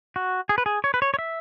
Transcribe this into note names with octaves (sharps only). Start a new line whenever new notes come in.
F#4
G#4
B4
G#4
C#5
B4
C#5
C#5
E5